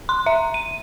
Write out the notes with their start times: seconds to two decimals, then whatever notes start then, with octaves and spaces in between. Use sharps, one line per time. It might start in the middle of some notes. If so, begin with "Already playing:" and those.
0.09 C6
0.26 E5
0.54 D#7